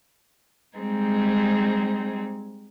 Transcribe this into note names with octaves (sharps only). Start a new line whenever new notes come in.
G3 G#3 C4 D#4 G#4